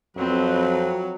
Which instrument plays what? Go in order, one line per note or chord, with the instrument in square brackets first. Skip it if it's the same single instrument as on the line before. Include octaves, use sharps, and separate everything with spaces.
[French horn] F2 [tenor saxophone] F#3 [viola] C4 B4